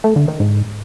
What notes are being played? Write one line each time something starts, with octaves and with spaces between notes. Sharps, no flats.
A3
D3
D#3
G#2